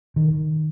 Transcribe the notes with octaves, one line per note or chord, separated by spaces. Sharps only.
D#3